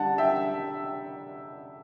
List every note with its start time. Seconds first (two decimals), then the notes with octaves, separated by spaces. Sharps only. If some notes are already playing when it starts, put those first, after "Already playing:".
Already playing: D3 G3 D4 F#5 A5
0.18 E5 G5